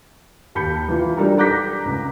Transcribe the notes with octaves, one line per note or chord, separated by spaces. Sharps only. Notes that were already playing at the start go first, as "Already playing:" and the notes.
D#2 A5 B5 G6 C#7
E3 F4
G3 D4 D#4 A4 A#4
A#5 D6 F#6 G6 A#6 B6
C#2